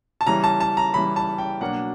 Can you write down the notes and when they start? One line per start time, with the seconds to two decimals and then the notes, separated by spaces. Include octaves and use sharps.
0.21 A5
0.27 C#3 E3 G3 A#5
0.44 A5
0.60 A5
0.77 A#5
0.94 C#3 E3 G3 B5
1.16 A5
1.38 G5
1.61 B2 F#3 A#3 D4 F#5